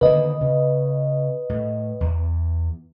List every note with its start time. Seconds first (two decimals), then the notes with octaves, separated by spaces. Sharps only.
0.01 D3 D#3 A#3 B4 D#5
0.41 C#3
1.49 A2
2.00 E2